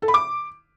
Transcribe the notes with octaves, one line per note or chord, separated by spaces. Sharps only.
A4
B5
D6